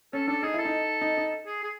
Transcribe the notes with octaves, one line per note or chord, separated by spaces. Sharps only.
C#4 A4
D4 A4
D#4 G#4
E4 A4
D#4
D#4
D#4
G#4
G#4